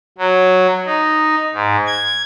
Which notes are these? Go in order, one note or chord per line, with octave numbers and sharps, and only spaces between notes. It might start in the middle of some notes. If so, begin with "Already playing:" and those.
F#3
D#4
G#2
G#6